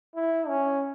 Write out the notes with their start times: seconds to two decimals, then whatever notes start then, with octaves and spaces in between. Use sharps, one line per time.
0.15 E4
0.48 C#4